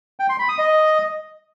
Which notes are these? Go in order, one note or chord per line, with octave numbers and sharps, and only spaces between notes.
G5
C6
B5
D#6
D#5